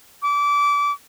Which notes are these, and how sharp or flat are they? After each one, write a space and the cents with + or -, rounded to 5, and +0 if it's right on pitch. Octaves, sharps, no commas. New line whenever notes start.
D6 -25